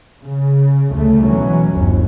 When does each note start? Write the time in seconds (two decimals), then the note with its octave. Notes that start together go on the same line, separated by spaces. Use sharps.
0.20 C#3
0.90 D2 C#3 A3
1.22 B2 E3 F#3 C#4
1.71 G1 D#2